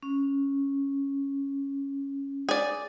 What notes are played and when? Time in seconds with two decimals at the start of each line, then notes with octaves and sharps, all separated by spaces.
0.03 C#4
2.49 G#4 D5